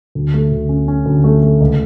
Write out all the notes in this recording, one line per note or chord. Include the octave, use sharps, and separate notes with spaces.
D2
A3
D2
C#4
C#4
D2
A3
A3
C#2